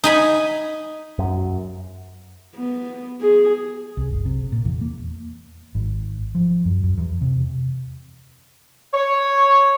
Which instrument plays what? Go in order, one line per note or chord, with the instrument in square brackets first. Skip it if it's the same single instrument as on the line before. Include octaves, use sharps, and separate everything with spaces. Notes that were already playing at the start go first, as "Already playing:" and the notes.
[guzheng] D#4 G#5 B5
[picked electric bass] F#2
[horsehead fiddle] B3
G#4
[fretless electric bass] C2
F#1
C3
A#2
E2
A#3
[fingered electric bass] G#1
F3
F#2
F#2
E2
C3
[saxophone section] C#5